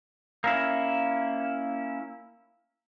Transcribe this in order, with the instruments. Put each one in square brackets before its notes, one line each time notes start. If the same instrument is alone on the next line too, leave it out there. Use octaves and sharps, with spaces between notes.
[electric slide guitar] A#3 C#4 E4